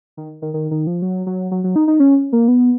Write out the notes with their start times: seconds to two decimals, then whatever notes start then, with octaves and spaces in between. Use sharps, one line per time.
0.17 D#3
0.42 D#3
0.54 D#3
0.71 D#3
0.87 F3
1.02 F#3
1.26 F#3
1.51 F#3
1.64 F#3
1.76 D#4
1.88 D#4
2.00 C#4
2.33 A#3
2.48 B3